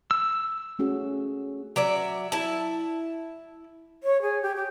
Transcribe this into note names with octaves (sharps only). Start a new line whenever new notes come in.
E6
A3 C#4 F#4 G#4
F#3 D5 E5
E4 A5
C#5
G#4
G4
G4